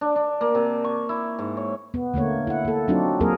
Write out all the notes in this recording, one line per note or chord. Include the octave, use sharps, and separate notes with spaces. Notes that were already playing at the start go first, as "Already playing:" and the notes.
D4
D4
A#3
C3
C#6
E4
G#2
C#5
B3
D3 A3 A#3 C#5
E4 F#5
A#3 A4
F#3 C4 D4 D#4 F4 F#4
F#3 A#3 C4 G#4 A#4